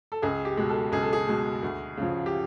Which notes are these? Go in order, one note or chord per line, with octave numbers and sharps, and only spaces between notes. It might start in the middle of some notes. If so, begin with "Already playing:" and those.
A4
C#2 G#4
G4
B2 G#3
A4
C#2 G#4
A4
G#4
B2 G#3
D2
C#3 F3
G4